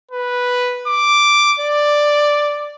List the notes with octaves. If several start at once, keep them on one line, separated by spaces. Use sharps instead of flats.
B4
D6
D5